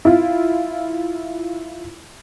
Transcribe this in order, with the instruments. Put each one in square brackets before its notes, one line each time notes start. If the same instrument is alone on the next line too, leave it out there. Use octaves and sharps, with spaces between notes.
[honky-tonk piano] E4 F4